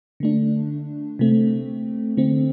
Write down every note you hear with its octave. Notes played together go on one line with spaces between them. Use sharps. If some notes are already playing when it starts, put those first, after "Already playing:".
D3 A3 D4
C3 A3 C4
D3 A3 C4